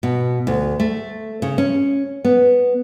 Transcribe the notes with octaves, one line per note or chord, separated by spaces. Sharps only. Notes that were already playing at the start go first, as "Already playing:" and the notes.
B2
D2
A3
C#3
C#4
B3